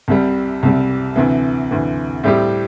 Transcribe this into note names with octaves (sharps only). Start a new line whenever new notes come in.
C2 C3 G3
C2 C3 G3
D2 C3 E3
D2 C3 E3
A2 G3 C4 E4 G4